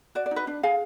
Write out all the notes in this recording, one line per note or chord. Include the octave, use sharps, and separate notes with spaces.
F#4 D5
D5
D#4
B4 D#5
D4
G#4 F5 G#5